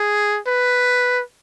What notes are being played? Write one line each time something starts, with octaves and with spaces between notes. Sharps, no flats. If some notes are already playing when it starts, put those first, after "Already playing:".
Already playing: G#4
B4